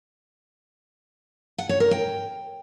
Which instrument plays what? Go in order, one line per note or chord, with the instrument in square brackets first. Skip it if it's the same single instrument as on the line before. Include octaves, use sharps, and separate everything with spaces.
[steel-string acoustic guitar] F#5
C#5
A#4
G5